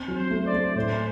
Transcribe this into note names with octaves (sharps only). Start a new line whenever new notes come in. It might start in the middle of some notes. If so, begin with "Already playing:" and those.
Already playing: C4
F#3
C5
A3
D5
A3
A2 C5